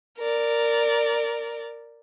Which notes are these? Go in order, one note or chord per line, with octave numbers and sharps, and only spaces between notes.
A#4 D5